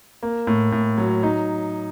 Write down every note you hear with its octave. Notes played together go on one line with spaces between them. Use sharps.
A#3
A2
A2
F#3
D#4